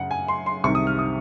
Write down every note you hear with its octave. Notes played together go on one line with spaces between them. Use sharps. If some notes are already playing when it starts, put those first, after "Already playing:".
Already playing: F#2 C#3 F#5
G#5
C6
C6
C2 C3 D#3 C#6
D#6
F6
D#6